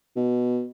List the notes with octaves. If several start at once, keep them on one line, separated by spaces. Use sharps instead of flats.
B2